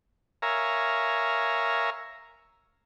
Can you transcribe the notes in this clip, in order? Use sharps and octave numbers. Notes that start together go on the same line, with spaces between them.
A#4 C#5 E5 F5 G#5 A#5